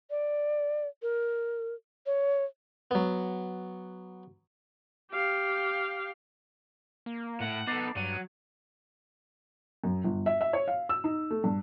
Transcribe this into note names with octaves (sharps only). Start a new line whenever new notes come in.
D5
A#4
C#5
F#3 B3
G4 F5
A#3
A2 F#5
B3 D#4 A4 D6 A6 C7
G2 F#3 D#7
F#2
G1
E5
E5
C#5
F5
E6
D#4
A3
G2